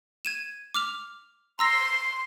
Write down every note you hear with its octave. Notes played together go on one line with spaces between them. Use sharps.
G#6 D#7 E7
D6 F6 F7
A#5 C6 E6 A#6